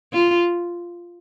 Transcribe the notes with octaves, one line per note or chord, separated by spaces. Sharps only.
F4